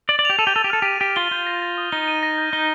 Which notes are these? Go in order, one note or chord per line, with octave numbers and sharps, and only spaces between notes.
D5 A6
D5
G4 F7
A4 D#7
G4
A4 D#7
G4
A4 F6
G4 D#7
G4 A6
F4 G7
F4 G6
A#6
A6
D#6
D#4 G7
D#7
A#6
G6
D#4 G7